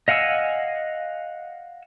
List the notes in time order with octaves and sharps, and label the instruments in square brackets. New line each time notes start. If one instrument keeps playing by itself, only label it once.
[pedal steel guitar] D#5 F5 F#5 G#5 E6